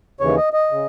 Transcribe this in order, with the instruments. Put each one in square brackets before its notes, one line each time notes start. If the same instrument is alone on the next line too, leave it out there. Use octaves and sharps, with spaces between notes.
[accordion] D#2 C#3 E3 C#5
D#5
D#5
C#3